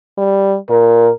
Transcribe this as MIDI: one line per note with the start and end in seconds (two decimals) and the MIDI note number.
0.18 0.56 55
0.70 1.09 46
0.70 1.13 70